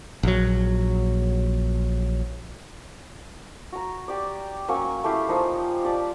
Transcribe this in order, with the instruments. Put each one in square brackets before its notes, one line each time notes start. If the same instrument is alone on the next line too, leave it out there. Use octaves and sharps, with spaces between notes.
[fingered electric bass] A#1 F#3
[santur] F#4 A#5
G4 D5
F#3 A#3 C#4 C#6
A3 E4 G4 F5
F3 A#3 D#4 F4
D4 G4 D5